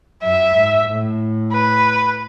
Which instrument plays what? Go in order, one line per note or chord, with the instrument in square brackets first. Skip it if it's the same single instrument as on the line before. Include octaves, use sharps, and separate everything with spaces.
[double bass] F#2 [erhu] E5
[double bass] G#2
A2
[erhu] B4